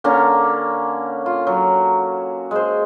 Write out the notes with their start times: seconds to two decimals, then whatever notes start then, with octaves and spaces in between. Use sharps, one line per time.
0.04 D3 A#3 C#4 A#5
1.26 F4
1.47 F#3
2.51 G#3 C5